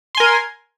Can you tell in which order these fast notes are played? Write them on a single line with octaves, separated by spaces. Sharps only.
C6 G#5 A#4